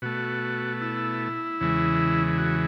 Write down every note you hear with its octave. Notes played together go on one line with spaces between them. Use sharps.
B2 A3 F#4
E4
E2 C#3 E3 G#3
F#4